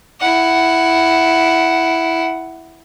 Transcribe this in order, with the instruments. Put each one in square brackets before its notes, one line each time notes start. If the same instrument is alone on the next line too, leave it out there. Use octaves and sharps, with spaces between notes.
[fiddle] E4 F#5